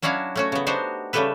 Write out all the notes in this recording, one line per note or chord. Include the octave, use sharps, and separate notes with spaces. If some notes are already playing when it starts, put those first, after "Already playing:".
F#3 C#4 D4 E4 F#4 F5
A3 C#4 F#4
C#3 B3
B3 D4 D#4 F#4 G4 C5
C#3 G3 A3 G4 A4 B4